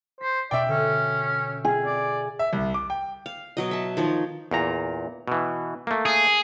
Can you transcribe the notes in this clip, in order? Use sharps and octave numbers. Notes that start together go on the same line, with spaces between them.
C5 B6
B2 C#4 D5 E5 G5
D3 C#4
G#4 F5
D5
E5
C2
D6
G5
F5
B2 F#3 D#5
E5 A5
D#3 F3 C#5
E2 A#2 A#5
B2 E3
A3 A#3
G#4